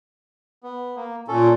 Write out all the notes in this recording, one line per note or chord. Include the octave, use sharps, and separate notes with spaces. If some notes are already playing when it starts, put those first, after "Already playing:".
B3
A#3
A#2 C#4 A4